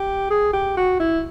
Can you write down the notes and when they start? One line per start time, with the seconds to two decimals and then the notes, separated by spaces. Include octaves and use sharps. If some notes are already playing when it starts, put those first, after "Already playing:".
Already playing: G4
0.31 G#4
0.53 G4
0.77 F#4
1.00 E4